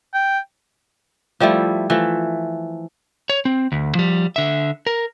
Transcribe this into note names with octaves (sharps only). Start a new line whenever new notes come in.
G5
F3 G3 A3 E4
E3 F3 A3
C#5
C4
D2
F3 G3
D3 E5
A#4